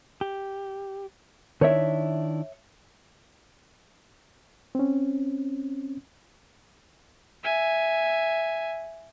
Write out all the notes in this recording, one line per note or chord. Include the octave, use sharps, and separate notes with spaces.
G4
D#3 D4 E4 C#5 E5
C4 C#4
E5 G#5